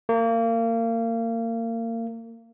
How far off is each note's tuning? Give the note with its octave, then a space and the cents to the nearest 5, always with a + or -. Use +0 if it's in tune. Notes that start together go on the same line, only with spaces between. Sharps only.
A#3 -30